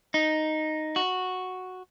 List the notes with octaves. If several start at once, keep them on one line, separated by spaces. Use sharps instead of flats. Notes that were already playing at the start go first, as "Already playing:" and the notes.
D#4
F#4